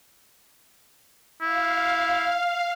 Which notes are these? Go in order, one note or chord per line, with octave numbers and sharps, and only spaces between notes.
E4 F5